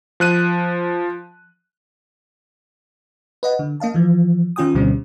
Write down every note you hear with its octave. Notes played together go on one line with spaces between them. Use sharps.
F3 F#6 D#7
B4 D#5 F#5
D3
A#3 D#5 F5 A5
E3 F3
D#3 C#4 F4 G5 G#5 D#6
D2 B2 D3 G3 C4 C#4